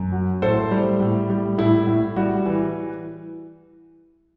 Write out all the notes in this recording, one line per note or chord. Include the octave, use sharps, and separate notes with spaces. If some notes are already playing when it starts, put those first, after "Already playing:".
Already playing: F#2
F#3
A2 A4 C5
G3
A2
G3
A2 E4
A2
G3 F#4
E3